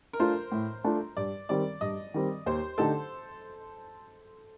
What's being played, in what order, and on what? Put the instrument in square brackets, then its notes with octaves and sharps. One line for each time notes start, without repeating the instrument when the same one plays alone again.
[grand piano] A#4
[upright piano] A3 D4 F4 [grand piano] C5
[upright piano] A2
A3 D4 F4
[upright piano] G2 [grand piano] D5
[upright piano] D#3 G3 C4 [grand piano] D5
[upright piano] G2 [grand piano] D#5
[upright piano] D#3 G3 C4
[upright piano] D#2 [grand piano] C5
[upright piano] D3 A3 D#4 G4 [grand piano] A4